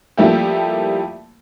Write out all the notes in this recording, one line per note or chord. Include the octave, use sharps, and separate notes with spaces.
F3 G3 A3 A#3 E4 G4